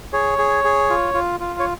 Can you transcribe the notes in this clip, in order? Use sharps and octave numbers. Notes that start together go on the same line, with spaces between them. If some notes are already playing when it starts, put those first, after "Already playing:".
G#4 C#5
G#4
G#4
F4
F4
F4
C#5